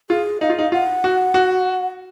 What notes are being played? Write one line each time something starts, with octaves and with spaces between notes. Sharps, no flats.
F4 G#4
D#4 F5
F4
D#4
F4 F#5
F#4
F#4